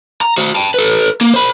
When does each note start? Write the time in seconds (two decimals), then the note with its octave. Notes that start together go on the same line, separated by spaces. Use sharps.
0.21 A#5
0.38 F#4 C5
0.55 G5 A5
0.74 A4 B4
1.21 A#3
1.34 C5 B5